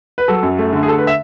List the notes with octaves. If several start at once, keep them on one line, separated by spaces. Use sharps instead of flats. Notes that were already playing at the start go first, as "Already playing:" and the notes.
B4
F#3 A4
F#2
A3
D3
G#4
A3 A4
B4
E5